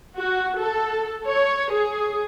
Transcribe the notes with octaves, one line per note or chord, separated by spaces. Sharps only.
F#4
A4
C#5
G#4